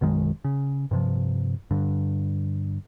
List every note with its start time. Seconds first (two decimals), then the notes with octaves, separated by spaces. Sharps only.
0.01 B1 F#2 D#3 G#3
0.44 C#3
0.91 G2 C3 F3
1.71 G2 D3